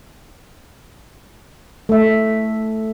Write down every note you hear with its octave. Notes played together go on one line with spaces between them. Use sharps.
A3 E5